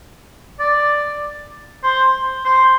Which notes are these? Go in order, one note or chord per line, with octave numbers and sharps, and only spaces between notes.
D5
C5
C5